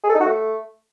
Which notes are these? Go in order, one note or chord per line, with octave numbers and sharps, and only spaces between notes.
G#4
A4
D#4
F#4
A3